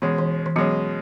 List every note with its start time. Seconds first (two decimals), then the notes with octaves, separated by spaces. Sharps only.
0.02 B2 E3 G#3 C#4
0.18 E3
0.46 E3
0.56 B2 F#3 G#3 C#4